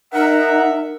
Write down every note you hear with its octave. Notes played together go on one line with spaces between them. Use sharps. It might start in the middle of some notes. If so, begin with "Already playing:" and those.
D#4 A#4 E5 F#5